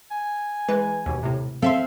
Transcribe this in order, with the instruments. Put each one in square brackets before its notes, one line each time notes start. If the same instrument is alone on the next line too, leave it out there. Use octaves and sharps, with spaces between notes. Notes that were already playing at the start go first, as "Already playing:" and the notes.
[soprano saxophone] G#5
[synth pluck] E3 G#3 B4
D#2 B2
A2 C3
[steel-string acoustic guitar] C4 [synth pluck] A4 E5 C6 [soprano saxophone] F5